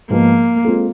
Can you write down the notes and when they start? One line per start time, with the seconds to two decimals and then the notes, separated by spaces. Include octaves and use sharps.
0.10 G#2 F3 G#3 A#3 B3
0.65 G#3 C4 F4 A4